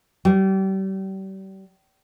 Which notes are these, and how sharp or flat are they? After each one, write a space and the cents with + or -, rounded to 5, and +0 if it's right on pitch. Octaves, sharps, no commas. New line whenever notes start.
G3 -35